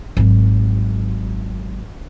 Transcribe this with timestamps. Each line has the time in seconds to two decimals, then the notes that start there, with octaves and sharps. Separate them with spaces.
0.17 G#1 F#3